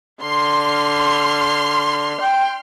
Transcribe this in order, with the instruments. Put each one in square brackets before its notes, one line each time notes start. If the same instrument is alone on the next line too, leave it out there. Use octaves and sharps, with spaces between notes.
[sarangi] D3 [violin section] C6 F6
[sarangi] G5